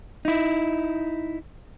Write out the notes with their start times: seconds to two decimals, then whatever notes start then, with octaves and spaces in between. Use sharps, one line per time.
0.25 D#4 E4